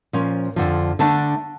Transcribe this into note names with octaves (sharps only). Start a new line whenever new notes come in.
A#2 F3 C#4
F2 D3 F3
D3 A3 D4 A5